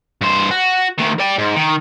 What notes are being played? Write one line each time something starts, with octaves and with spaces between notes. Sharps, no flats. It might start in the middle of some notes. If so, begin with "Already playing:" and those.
G2 C5
F#4
D2 D#3
D5 G5
G#2
D#3